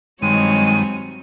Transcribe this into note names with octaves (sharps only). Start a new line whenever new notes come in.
G2 D#3 F#3 G#3 C4 C#5 D#7